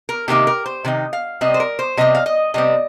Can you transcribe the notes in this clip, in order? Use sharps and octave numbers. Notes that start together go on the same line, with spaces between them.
A#4
C3 D#3 A#3 D#4 G4
A#4
C5
C3 D#3 D#4
F5
C3 G3 C4 D#5
C5
A#4
C5
C3 G3 C4 D#5
F5
D#5
C3 G3 C4 D#5